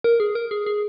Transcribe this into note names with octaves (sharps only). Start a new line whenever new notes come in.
A#4
G#4
A#4
G#4
G#4